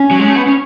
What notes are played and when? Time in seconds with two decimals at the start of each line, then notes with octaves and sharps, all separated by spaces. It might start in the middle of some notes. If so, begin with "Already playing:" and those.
Already playing: C#4
0.11 F#3
0.19 G#3
0.28 A3
0.35 B3
0.47 C#4